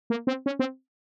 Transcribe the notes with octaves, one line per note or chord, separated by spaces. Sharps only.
A#3
C4
C#4
C4